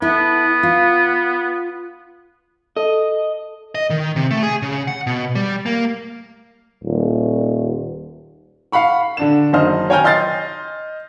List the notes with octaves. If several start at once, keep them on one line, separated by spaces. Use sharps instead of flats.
B3 E4 A4
F4
A4 D#5
D#5
D#3
C3
A3
G#4
C#3
F#5
B2
G3
A#3
D#1
F5 F#5 B5 C#6
D3 D4 E7
F#1 F#2 D#3 C5 D#5 F6
C#5 G5 G#5 A#5 F6 G6
D#5 C6 F6 G6 A6 C7